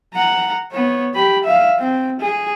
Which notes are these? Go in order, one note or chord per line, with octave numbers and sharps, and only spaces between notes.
F#5 A#5
B3 C#5
G4 B5
E5 F5
C4
G#4